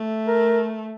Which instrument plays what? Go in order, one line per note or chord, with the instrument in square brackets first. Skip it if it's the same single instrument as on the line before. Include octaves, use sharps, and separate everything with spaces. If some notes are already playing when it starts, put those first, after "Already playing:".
Already playing: [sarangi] A3
[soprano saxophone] A#4